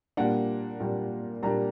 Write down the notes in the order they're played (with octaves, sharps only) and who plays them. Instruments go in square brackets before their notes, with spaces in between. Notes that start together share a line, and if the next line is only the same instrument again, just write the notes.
[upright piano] A#2 G3 A#3 D4 F#5
A#2 G3 A#3 D4
A#2 G3 A#3 D4 A#5